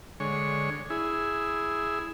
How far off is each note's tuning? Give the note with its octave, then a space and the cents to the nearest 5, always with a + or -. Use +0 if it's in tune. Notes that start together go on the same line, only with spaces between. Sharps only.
D3 +0 G#3 +0 C#5 +0
E4 +0 G#4 +0